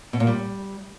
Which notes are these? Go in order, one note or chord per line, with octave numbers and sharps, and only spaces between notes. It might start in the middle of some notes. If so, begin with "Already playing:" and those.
B2
A#2
G3